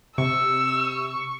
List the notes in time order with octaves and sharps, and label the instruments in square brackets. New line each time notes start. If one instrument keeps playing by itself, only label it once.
[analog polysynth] C3 [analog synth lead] C#6 [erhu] E6